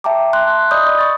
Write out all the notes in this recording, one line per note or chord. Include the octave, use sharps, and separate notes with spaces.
E5 G5 A5 A#5 D6
C6 F#6
D5 D#5 B5 D6 D#6 G6
C#6 A6